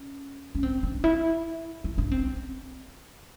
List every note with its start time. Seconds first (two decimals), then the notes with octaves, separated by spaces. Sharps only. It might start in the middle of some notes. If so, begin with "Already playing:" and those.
Already playing: C#4
0.55 C#4
0.63 C4
0.83 D4
1.04 E4
1.84 E4
1.98 D4
2.12 C4
2.26 C4